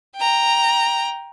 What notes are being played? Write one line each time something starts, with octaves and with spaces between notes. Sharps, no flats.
G5 A#5